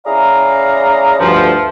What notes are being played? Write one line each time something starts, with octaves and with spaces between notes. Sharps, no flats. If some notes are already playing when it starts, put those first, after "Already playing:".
C#4 E4 G#4 D5 F5 A#5
D2 G2 F3